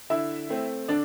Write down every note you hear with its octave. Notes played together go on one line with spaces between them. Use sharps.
D3 E4 E5
A3 C4
D3 D4 D5